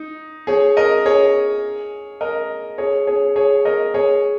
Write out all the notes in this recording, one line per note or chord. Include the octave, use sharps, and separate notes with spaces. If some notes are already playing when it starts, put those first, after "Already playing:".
Already playing: D#4
G#4 C#5
A#4 D#5
G#4 C#5
A#4 D#5
G#4 C#5
G#4 C#5
G#4 C#5
A#4 D#5
G#4 C#5